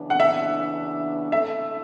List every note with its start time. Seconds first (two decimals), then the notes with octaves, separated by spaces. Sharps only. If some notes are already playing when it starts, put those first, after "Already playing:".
Already playing: F#2 C#3 E3 B3 D4
0.10 F#5
0.20 E5
1.32 D3 A3 E4 A4 E5